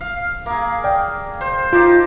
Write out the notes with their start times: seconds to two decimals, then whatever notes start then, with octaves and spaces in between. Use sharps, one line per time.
0.01 F5
0.46 A#3 G#4
0.84 D5 G5
1.41 C5
1.73 D#4 F4 G4 A5